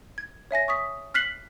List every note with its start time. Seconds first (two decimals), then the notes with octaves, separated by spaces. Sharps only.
0.18 G#6
0.51 C#5 E5 G#5 A#6
0.68 C#6 D#6 B6
1.14 F6 F#6 B6 C7 F#7